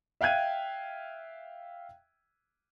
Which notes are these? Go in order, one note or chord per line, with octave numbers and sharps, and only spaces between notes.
E5 F5 G5 F#6 G#6 D#7